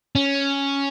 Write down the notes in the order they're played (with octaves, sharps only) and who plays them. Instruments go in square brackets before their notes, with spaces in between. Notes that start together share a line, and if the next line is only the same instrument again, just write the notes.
[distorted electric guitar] C#4